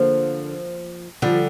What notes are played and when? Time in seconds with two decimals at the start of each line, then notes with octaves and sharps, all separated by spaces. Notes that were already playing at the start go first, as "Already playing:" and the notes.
Already playing: D3 F3 A#3
1.22 D3 F3 G3